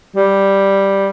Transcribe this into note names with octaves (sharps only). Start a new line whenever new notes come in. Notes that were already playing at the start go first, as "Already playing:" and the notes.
G3